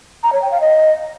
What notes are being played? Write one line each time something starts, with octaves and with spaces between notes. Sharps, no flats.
A#5
C#5
G5
F5
D#5